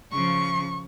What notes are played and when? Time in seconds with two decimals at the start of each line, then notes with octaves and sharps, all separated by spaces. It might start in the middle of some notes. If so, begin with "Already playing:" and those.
0.12 C#3 F3 C#6